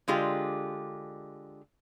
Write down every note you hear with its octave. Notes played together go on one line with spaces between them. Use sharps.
D3 G#3 F4 G4